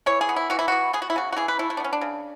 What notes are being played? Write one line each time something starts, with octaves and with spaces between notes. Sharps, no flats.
E3 C#5
G#4
B3
E4
E3 F#4
E4
B3 F#4
B3 G#4
F#4
E4
C#3 F#4
F#4
E3 G#4
B4
A3 E4
E4
D4
B3 C#4
D4
C#3